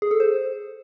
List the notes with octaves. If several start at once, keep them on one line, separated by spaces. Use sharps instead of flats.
G#4
A4
C5